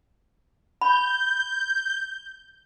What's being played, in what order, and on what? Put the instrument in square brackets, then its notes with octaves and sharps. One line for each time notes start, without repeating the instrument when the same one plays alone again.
[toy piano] B5 [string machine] G6